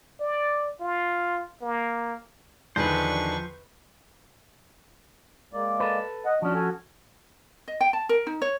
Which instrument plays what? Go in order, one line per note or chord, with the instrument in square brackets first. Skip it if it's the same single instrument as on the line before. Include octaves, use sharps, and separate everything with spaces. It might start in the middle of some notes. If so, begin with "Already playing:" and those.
[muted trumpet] D5
F4
A#3
[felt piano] E2 D3 D#3 [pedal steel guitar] F3 C5 [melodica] D4 [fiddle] B4 C#6
[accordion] G#3 A#3 D5
[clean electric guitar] A4 B4
[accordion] D#5 F#5
[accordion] E2 D4 F#4 [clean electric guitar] F3 C#4
[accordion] F#4 A4 G#5
[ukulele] D#5
G5
A5
A#4
D#4
C#5